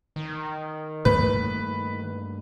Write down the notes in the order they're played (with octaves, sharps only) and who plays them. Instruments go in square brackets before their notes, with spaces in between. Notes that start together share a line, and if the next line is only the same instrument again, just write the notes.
[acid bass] D#3
[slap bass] G2 A3 A#3 [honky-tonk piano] B4